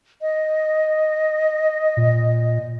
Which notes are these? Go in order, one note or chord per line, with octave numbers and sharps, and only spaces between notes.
D#5
A#2